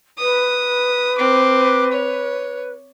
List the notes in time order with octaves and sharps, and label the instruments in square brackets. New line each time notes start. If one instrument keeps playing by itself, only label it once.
[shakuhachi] B4 [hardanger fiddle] D#6
[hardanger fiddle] C4 D6
C#5